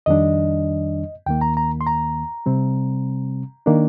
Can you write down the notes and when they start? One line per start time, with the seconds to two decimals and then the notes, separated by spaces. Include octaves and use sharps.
0.06 F2 D#3 G3 D4 D#5
1.26 D#2 D#3 A#3 G5
1.41 A#5
1.57 A#5
1.81 C6
1.87 A#5
2.46 C3 G3 C4
3.66 D#3 A#3 D4